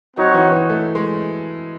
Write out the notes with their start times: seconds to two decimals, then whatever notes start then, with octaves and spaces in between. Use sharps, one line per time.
0.17 F#3 C4 D#4 F#4 C#5 F#5
0.34 E3
0.52 E3
0.69 A3
0.95 G#3